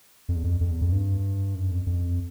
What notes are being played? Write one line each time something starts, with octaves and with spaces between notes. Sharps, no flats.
F2
E2
F2
F2
E2
F2
G2
F#2
F2
F2